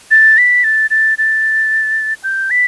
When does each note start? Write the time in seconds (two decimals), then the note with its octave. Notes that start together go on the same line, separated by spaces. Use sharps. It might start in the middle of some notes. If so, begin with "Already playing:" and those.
0.11 A6
0.38 B6
0.64 A6
0.90 A6
1.18 A6
2.24 G6
2.51 B6